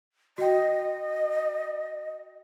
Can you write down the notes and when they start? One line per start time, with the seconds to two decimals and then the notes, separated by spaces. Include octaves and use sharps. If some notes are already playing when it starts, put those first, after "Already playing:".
0.38 F#4 D#5 G5